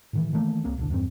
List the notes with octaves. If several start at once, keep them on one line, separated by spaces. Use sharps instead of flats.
A2 D#3 E3
D#3 E3 A3 A#3
C2 A#3 C4
D1 B1 B2 D3
E2 G2 C#3 C4